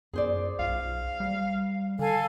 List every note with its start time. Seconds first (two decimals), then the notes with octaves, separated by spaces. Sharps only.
0.13 F#2 G#4 C5 D5
0.59 B1 F5
1.20 G3
1.99 D3 A4 F5 G#5